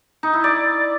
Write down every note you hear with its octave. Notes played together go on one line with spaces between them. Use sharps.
D#4
E4
D5